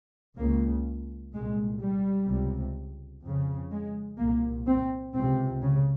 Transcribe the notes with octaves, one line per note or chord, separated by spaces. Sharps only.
C#2 C#3 A#3
C2 A#2 G#3
G3
C#2 C3
F2 C#3
G#3
C2 A#2 A#3
C4
C#2 C3 C4
C#3